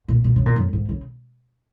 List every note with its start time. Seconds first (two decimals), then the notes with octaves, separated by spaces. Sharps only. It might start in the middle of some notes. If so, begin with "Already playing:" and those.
0.08 A#2
0.24 A#2
0.36 C#3
0.46 A#2
0.56 F#2
0.73 G#2
0.89 C#3